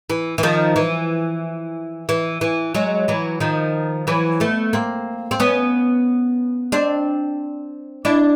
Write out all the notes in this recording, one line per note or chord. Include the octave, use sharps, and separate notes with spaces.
E3
E3
D#3 F3
E3
E3
E3
F#3 G#3
E3 F#3
D#3 F3
E3 F#3
A3 B3
A#3 C4
C4
B3 C#4
C4 D4
D4 E4